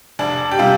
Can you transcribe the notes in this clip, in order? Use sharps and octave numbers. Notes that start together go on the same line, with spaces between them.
F1 D4
G4
C3 G3 F4